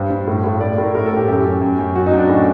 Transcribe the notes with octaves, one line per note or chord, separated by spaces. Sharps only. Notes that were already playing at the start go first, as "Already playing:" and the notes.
Already playing: G2 C5
G2
A2
A2
A2 D5
D5
A2
A#4
A2 A#4
A4
A2
G4
F#2 G4
F#2
F#2
F#2
F#2 F#4
D#4
F#2 D4
A2